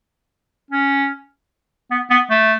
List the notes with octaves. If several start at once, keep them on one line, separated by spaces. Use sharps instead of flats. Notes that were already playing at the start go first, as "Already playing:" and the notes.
C#4
B3
B3
A3